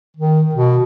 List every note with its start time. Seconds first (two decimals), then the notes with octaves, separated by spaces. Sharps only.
0.17 D#3
0.55 B2